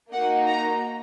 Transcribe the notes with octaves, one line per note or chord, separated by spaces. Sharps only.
A#3 D#4 F#4 F#5
A#5